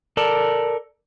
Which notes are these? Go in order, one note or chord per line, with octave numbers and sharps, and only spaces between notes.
A4 A#4 D5 A5